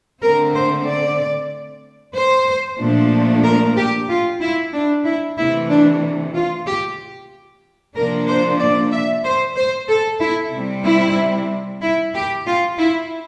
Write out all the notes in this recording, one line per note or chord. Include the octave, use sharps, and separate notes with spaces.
D3 A3 C4 A#4
C5
D5
C5
A#2 F3 A3 D4
A#4
G4
F4
E4
D4
E4
C3 E3 A3 E4
D4
F4
G4
C3 F3 A#3 D4 A#4
C5
D5
E5
C5
C5
A4
E4
C3 G3 C4
E4
E4
G4
F4
E4